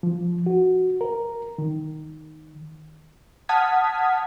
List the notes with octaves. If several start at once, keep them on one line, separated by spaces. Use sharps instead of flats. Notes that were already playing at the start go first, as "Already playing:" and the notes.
F3
F#4
A#4
D#3
F#5 A5 D#6 F6 G#6 B6